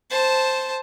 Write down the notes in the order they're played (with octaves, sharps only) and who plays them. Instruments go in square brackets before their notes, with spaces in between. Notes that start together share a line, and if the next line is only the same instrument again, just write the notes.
[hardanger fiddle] C5 A5